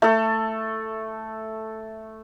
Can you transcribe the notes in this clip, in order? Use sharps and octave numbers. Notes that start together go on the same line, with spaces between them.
A3 A4